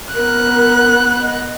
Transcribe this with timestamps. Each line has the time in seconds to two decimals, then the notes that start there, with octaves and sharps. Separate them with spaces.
0.15 B3 A#4 F#6
1.21 D#5